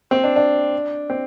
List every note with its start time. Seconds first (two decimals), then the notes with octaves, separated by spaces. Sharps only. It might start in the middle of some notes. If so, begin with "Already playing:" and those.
0.11 C4
0.24 D4
0.36 D4
1.10 C4